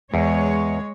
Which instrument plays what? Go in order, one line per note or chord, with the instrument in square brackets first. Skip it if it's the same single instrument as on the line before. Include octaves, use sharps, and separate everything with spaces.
[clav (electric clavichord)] E2 [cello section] G#3 C#5